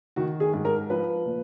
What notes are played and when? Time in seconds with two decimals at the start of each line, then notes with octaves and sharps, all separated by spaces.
0.16 D#3 F#4
0.40 G#4
0.53 G#2
0.65 A#4
0.90 F3 B4
1.25 A#2